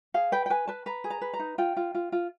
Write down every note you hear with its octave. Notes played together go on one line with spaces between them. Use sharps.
G#4 F5
B4 G5
G5
B4 G#5
B4 A5
B4 A#5
G#4
A#5
B4
A#5
D#4
F4 G5
F4
F4
F4